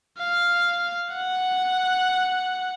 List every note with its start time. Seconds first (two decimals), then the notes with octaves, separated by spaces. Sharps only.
0.19 F5
1.14 F#5